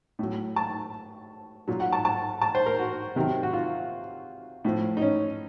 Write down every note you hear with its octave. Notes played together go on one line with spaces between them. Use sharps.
A2 F#3
A5
A#2 F#3
F#5
A5
A5
A5
C5
A#4
F#4
C3 D#3 F#3
F#4
F4
A2 F3
D#4
C#4